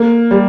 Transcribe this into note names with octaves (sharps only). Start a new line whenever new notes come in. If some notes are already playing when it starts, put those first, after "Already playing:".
Already playing: A#3
G3